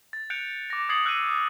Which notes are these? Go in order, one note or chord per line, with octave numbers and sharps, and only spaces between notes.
A6
F#6 G6 C#7 D7 F7
D6 A#6
D#6 G#6 A6 C7 C#7 F#7
E6 F#6 G6 A#6 C#7 D#7